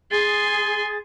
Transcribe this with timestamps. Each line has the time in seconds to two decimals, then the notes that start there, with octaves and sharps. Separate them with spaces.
0.11 G#4 G#5 C6 A6